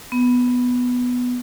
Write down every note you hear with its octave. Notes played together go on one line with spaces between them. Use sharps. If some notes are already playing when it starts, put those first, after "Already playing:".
B3